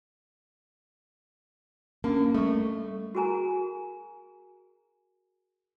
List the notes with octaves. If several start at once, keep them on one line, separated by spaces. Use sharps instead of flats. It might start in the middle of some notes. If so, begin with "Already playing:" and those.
A#3 C#4 D4
G3 A3 C#6
F#4 G#4 A#4 G#5 A#5